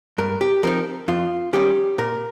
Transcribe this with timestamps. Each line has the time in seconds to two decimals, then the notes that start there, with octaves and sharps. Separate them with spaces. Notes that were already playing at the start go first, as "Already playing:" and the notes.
0.18 G2 A#4
0.41 G4
0.63 F3 C4 D#4 A#4
1.08 F2 F4
1.53 D#3 G3 C#4 G4
1.98 A#2 A#4